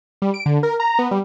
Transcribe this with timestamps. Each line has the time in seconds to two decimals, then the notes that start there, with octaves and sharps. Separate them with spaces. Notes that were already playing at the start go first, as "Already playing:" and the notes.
0.22 G3
0.34 D7
0.46 D3
0.63 A#4
0.80 A#5
0.99 B3
1.11 G3